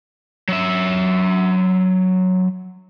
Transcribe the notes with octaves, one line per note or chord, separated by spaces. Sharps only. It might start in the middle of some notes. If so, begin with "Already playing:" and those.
F#3 E5